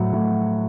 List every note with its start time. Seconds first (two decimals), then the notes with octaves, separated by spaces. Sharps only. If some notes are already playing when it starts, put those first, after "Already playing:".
Already playing: A2 F#3 F#5
0.13 A2